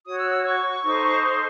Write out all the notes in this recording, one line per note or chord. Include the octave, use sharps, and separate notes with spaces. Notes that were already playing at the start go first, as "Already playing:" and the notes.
F#4 C#5 D#6
E6
E6
C#6
D#4 A4 C5
C6